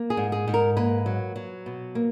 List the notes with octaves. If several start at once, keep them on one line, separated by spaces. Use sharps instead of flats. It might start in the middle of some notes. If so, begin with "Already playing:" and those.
Already playing: A#3
G#4
G#2
G#4
G#2
A#4
A#3 B4
F#3
F#3
B2
A#3